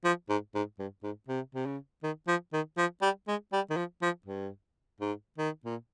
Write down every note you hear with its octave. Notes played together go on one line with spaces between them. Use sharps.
F3
G#2
G#2
G2
G#2
C3
C3
C#3
D#3
F3
D#3
F3
G3
G#3
G3
D#3
F3
F3
G2
G#2
D#3
A#2